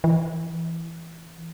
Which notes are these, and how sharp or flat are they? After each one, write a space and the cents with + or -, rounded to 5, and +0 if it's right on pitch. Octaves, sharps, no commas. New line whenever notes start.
E3 +10